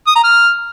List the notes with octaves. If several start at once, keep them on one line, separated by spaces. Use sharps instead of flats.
D#6
A#5
F6